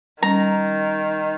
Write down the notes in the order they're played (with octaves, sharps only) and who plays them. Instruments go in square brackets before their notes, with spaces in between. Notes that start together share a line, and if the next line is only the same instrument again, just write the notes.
[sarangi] D#3 [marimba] G3 C#4 [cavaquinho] A#5